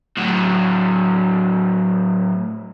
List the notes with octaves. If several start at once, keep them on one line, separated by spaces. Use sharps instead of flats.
A2 F#3